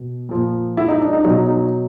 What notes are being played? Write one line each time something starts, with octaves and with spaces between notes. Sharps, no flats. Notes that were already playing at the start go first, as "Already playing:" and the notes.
Already playing: B2
A#2 F3
E4
D#4
D4
D#4
B2 F#3 D#4
D#4